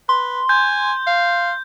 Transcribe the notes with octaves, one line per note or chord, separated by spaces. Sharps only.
B4 C6
G#5 G6
F5